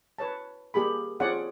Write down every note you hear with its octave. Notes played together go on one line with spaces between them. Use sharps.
B4 C#5 A5
A#3 G4 G#4 B5
C4 F4 G#4 C#5 D5 F#5